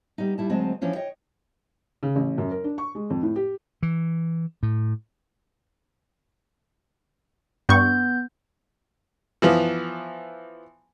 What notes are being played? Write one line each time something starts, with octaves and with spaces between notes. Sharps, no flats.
G3 B3 D#4
G3 E4 A5
D2 F#3 G#3 C4 D#5 A5
E3 F3 C#4 D4
C#5 D#5 G5
C#3
A1
F#2
A#4
D4
C#6
G#3
F2
A2
G4
E3
A2
G2 B3 C#6 G6
E3 F3 B3